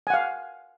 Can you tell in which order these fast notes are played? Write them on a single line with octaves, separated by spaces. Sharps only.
G#5 F#5 F5